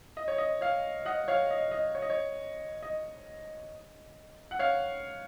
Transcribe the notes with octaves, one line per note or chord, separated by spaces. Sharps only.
D#5
C#5
D#5
C#5 F5
D#5 F#5
C#5 F5
D#5
D#5
C#5
D#5
C#5
D#5
F#5
C#5 F5